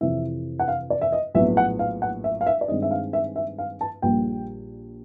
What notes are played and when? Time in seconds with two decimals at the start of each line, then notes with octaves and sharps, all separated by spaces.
0.01 F2 C3 E3 E5
0.59 F#5
0.68 F5
0.90 D5
1.01 E5
1.12 D#5
1.35 A#1 A2 F#3 B3 E5
1.57 F#5
1.79 F5
2.02 F#5
2.24 E5
2.41 F5
2.46 E5
2.61 D5
2.68 G2 D#3 G#3 C4 D#5
2.82 E5
2.91 F5
3.13 E5
3.36 E5
3.58 F5
3.81 A5
4.02 A#1 A#2 G3 A#3 G5